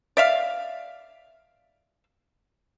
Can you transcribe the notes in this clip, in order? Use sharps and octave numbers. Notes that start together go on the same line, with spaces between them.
D5 E5 F5